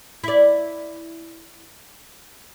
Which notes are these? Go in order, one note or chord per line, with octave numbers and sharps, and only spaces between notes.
E4 D5